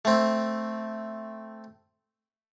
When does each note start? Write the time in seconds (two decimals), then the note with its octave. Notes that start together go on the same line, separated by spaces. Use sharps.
0.05 A3 C4